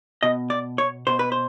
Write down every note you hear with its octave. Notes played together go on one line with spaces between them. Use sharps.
B2 D#5
D5
C#5
B2 C5
B4
C5